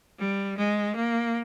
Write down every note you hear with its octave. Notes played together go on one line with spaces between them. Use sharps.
G3
G#3
A#3